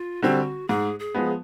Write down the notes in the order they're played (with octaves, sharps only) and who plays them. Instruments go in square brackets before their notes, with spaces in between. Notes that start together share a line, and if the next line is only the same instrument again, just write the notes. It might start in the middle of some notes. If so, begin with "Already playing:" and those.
Already playing: [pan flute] F4
[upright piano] D3 G3 C4 [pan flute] F#4
[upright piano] G#2 [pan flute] G#4
[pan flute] G#4
[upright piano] F3 G#3 B3